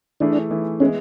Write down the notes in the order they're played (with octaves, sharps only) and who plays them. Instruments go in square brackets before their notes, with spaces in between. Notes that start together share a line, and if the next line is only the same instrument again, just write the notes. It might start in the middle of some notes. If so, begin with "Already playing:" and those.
[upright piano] E3 A3 E4 G#4 [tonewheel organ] D4
[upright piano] E3 A3 E4 G#4
[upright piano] E3 G#3 B3 E4 [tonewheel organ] C#4